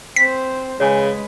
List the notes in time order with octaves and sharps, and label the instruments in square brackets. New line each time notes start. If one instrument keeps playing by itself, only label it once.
[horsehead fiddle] C4 C5 [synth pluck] B6
[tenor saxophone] C#3 [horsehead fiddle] G#3 B4 [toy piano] C#5 G#5